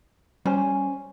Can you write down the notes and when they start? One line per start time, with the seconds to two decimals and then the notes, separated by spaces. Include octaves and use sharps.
0.45 G3 C#4 C5 G#5